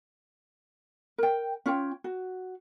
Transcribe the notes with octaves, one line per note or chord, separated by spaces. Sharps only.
A#4 G5
C#4 F4 C#5 G5
F#4